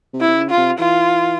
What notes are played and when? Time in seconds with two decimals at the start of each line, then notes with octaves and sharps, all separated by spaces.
0.13 C3
0.21 E4
0.27 C3
0.35 C#3
0.50 F4
0.57 C3
0.79 E3 F4